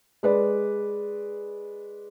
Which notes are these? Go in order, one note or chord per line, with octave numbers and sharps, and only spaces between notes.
G#3 B4 D5